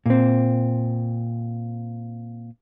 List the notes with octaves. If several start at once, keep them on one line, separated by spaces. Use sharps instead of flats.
A#2 C4